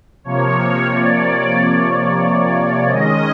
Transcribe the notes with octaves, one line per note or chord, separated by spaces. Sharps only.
C3 F3 A#3 C#5
D5
D#3 G#3 C#4 D#5